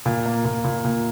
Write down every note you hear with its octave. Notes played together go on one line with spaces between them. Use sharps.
A#2
A#3
A#2
A#2
A#2